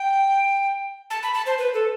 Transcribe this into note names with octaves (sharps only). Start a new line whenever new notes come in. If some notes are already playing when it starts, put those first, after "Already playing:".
Already playing: G5
A5
B5
A5
C5
B4
A4